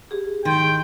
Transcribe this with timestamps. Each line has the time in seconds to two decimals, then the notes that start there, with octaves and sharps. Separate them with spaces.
0.11 G4 G#4
0.45 G#2 D#3 G5 C6